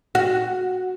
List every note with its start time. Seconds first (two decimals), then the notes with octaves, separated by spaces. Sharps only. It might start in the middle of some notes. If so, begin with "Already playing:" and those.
0.15 F#4